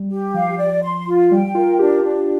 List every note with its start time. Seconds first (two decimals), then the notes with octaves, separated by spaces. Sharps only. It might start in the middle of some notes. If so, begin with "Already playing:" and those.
Already playing: G3
0.11 G4
0.34 F3 F5
0.58 D5
0.83 C6
1.07 F4
1.31 G3 G5
1.55 F4 A#4
1.79 D4 G4
2.03 D4